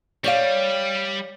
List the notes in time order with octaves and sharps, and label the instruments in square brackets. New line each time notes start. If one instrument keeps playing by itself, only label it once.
[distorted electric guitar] G3 [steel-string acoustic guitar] C#5 D5 F5